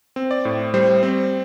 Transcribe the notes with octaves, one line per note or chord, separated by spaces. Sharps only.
C4
D5
A2
G3 C5
C4